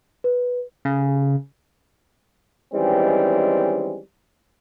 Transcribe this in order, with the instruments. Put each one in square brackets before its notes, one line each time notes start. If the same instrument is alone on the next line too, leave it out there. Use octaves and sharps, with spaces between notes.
[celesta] B4
[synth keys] C#3
[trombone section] D#3 E3 G3 G#3 C4 C#4